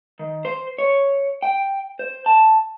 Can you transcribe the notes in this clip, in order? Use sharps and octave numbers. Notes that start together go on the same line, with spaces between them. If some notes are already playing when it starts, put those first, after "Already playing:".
D#3
C5
C#5
G5
C5
A5